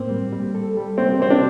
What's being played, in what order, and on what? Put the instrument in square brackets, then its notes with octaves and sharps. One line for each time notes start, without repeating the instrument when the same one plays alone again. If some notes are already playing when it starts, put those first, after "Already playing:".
Already playing: [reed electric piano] A2 A#3 [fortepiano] C4
[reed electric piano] G3
G3
A4
G3
[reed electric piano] A#3 [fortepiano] C4
[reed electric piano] A#3 [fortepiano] C4
[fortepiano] D4